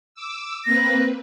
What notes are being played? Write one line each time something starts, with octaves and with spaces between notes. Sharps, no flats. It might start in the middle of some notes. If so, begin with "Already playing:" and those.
D6 E6
A#3 C4 B4 A#6